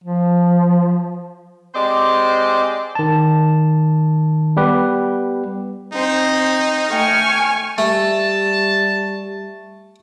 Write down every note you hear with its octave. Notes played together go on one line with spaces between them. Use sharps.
F3
G#3 C4 G4 C5 D5 D#5
D#3 A5
G3 B3 G4 B4
C4 D#4 C5
A3 G5 G#5 C#6 F6
G3 A3 A5